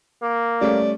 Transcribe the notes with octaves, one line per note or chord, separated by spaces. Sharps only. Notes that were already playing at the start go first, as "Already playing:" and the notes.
A#3
G3 A3 C#4 D5